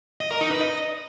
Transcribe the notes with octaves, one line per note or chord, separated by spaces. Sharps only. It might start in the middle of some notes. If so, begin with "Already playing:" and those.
D#5
A#4
D#4
B4
D#5